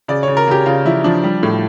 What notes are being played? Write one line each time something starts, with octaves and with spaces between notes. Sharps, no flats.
C#3 D5
C#3 C#5
A#4
C#3 G4
C#3 F4
F3 E4
F3 D4
G3
A2